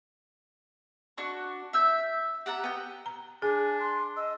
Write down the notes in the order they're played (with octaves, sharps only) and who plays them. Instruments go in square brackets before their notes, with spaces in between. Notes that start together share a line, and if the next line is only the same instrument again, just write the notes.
[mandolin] D4 F#4 C#6
E5 E6 G6
G4 F#5 A5 A#5
B3 G5
[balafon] A#5
[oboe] D4 [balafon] G#4 [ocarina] G#5
[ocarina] C6
[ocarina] D#5 [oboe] E6